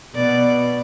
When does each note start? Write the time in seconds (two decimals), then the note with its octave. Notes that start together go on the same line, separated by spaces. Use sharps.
0.15 B2 B3 D5